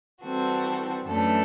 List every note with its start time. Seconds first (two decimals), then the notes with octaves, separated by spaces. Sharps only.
0.23 E3 G3 C4 F#4 A4
1.05 F#2 E3 A3 D4 A4